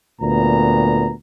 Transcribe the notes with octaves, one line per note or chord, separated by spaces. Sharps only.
D2 A#2 B3 A#5